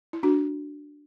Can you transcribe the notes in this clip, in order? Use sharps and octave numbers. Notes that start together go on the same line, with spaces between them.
E4
D4 F#4